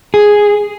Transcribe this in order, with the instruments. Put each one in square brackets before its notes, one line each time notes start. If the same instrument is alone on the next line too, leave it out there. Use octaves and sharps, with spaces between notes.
[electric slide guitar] G#4